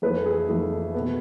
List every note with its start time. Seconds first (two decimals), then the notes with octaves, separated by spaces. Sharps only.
0.02 F2 E3 A3 B4
0.26 G#4
0.49 F2 E3 A3
0.94 B2 B3